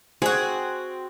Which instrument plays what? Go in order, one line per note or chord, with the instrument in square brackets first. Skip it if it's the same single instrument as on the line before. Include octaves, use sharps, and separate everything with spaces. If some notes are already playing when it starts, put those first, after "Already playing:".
[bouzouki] C4 F#4 [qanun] G#4